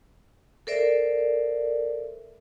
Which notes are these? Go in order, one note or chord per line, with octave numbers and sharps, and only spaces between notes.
A4 A#4 C5 D5 E5